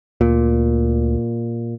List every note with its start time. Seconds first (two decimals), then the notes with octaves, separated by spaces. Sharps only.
0.21 D2 A#2